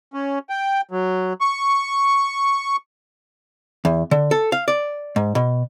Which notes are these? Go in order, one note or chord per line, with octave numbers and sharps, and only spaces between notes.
C#4
G5
F#3
C#6
E2
D3
A4
F5
D5
G#2
B2